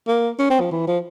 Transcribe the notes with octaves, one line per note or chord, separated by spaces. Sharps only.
A#3
C#4
C4
F3
E3
F3